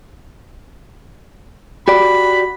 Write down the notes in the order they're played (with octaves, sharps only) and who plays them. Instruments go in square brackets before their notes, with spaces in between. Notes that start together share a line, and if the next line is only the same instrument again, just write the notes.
[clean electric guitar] F#4 G4 D5 [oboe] B5